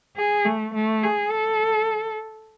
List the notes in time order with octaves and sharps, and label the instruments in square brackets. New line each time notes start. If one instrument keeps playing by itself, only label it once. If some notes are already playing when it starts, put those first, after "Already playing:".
[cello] G#4
A3
A3
G#4
A4